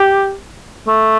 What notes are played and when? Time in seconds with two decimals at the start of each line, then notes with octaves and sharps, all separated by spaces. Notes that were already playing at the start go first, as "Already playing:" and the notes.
Already playing: G4
0.87 A3